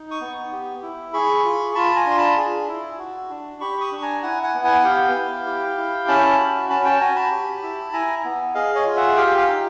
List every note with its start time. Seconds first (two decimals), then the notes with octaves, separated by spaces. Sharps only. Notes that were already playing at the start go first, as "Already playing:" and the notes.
Already playing: D#4
0.11 C#6 D#6
0.21 B3
0.52 G4
0.82 E4
1.13 G#4 B5 C#6
1.45 F4
1.75 F4 A5 B5
1.96 G#5 A#5
2.06 D4
2.11 C6
2.17 A5 B5
2.37 G#4
2.69 E4
2.99 F#4
3.30 D4
3.60 G4 B5 C#6
3.81 C#6 D#6
3.92 D4
4.02 G#5 A#5
4.23 E4 F#5 G#5
4.43 F#5 G#5
4.54 B3
4.64 F#5 G#5
4.84 G4 F5 G5
5.15 E4
5.47 G4
5.77 E4
6.08 C#4 A5 B5
6.39 F#4
6.69 C#4 A5 B5
6.85 G5 A5
7.00 F#4 G#5 A#5
7.16 A5 B5
7.31 G4
7.62 E4
7.93 E4 G#5 A#5
8.25 B3
8.54 G#4 D#5 F5
8.75 C#5 D#5
8.86 F4
8.96 E5 F#5
9.17 G4 F5 G5
9.38 F5 G5
9.47 D#4